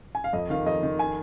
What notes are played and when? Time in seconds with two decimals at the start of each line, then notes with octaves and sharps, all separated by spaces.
0.15 G#5
0.24 F5
0.33 F2 D#5
0.50 D#3 F5
0.66 F2 D#5
0.83 D#3
0.99 G#5